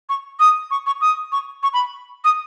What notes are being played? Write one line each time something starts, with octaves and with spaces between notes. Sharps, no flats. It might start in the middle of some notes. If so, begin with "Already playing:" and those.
C#6
D#6
C#6
C#6
D#6
C#6
C#6
B5
D#6